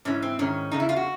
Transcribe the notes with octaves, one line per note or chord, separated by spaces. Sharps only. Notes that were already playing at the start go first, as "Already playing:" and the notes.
G#2 E3 C#4
C4
G#2 D#3 C#4
E2 C#3 D#4
E4
F4
F#4